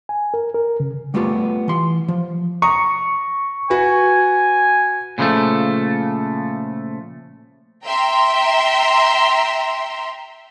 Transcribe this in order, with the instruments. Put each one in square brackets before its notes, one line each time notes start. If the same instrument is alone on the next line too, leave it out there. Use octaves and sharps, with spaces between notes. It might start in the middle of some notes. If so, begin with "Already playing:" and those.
[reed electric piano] G#5
A#4
A#4
C#3
[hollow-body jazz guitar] G3 A3 B3 F4 G4
E3 C6
F3
[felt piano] A#5 D#6 [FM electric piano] C#6
[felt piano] F#4 B4 [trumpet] G#5
[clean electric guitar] A#2 C#3 F3 G3 A3
[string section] E5 G5 A#5 C6